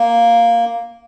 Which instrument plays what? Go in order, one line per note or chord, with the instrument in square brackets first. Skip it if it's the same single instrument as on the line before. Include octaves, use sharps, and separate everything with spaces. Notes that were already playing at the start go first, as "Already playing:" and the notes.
Already playing: [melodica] A#3